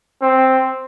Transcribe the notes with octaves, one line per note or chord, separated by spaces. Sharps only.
C4